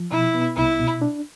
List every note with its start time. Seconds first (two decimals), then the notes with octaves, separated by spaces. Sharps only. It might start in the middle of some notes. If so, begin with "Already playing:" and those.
Already playing: F3
0.11 B2 E4
0.35 B3
0.57 C2 E4
0.80 B2
1.02 D4